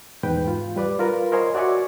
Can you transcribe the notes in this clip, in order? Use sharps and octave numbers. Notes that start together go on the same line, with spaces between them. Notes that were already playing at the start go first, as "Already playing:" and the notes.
E2 G#2 B4 G5
F4
G3 B4 D5
F4 A#4 B4
A#4 C5 C#5 D#5 G#5 C6
F#4 D5 E5 G#5 C#6